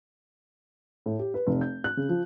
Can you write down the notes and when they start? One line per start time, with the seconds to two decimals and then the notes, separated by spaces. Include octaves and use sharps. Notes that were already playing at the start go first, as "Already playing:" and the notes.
1.06 A2
1.19 G4
1.34 B4
1.47 F1
1.61 G6
1.84 F#6
1.97 C#3
2.09 F3